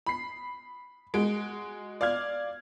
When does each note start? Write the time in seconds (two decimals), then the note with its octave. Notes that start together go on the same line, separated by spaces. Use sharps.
0.06 B5 C7
1.14 G#3 F#4 D7
2.01 D5 F5 F6 G#6